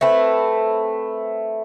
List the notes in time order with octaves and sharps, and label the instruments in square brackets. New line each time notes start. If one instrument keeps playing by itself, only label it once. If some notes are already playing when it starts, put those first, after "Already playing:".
[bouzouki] A3 C4 E4 B4